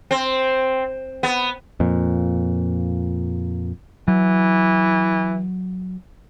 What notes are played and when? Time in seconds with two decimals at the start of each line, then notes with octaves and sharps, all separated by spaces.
0.11 C4
1.23 B3
1.80 F2 A#2
4.08 E3 F#3